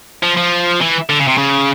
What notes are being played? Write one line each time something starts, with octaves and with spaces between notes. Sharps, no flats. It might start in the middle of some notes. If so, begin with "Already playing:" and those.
F3
F3
E3
D3
C#3
C3
C#3